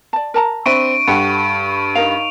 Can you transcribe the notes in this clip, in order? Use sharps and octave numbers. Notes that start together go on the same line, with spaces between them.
D5 A5
A#4 A5 A#5
C4 D4 E5 B5 C#6 D7 D#7
G2 G4 A4 F#5
D#4 A#4 F5 F7